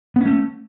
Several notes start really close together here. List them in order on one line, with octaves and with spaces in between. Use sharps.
B3 C#4 A3